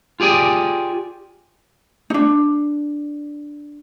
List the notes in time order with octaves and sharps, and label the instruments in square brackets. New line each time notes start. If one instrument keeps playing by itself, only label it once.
[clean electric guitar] F4 G4 G#4 D5 G#5
[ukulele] D4 D#4